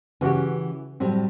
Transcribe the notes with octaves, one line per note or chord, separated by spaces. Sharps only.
C#3 E3 C#4 F#4 G4
A2 F#3 G3 C4